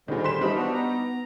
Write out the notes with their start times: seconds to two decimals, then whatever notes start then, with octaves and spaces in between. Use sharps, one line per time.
0.08 A#2 D3 D#3 G3 G#3 C5
0.24 C5 C6 B6 E7
0.41 E3 F3 G3 D#4 B5
0.56 B3 D4 F#4
0.74 A#5